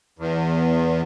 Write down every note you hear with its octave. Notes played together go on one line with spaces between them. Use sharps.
E2